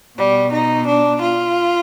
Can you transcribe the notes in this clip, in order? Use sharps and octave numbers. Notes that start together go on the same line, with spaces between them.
B2 G3
D#4
D4
F4